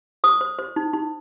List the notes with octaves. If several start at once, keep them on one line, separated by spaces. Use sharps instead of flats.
C5 D#6
C5
C5
D#4
D#4